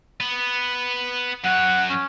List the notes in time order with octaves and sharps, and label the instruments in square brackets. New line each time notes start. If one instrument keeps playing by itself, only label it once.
[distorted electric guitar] B3
[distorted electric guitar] F#2 C#5 [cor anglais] F#5
[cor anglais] C#4